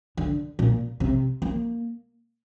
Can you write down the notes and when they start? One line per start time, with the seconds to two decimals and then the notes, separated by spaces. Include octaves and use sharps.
0.17 D3
0.59 A#2
1.00 C3
1.42 A#3